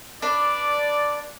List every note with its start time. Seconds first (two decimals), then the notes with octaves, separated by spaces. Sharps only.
0.22 D4 B4 D5